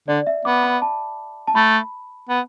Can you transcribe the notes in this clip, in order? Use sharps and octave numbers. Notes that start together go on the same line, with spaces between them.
D3 D5
E5
B3 D6
B5
A5
A5
A3 B5
B3